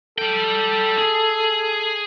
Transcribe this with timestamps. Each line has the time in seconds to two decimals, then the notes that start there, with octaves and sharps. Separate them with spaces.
0.18 G3 A4 G5
0.98 G#4